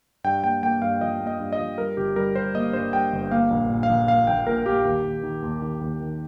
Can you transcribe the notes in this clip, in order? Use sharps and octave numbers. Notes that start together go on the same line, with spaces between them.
G2 G5
A#3 G5
A#3 G5
G2 F5
F3 D#5
A#3
D#5
G2
D#5
F3
G3 A#4
G1 G4
G3 A#4
G3 C5
A#3 D#5
G2 C5
G3 G5
G1
A#3 F5
A#1
A#2
F5
A#1
A#3 F5
A#1 G5
A#2 A#4
A#3 G4
D#2
D#2
D#3
D#2
D#3
D#2
D#3